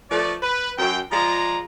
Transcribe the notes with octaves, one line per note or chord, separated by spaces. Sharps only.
F3 A3 B4 D5
B4
F#2 G5
F3 G#3 F4 D5 A#5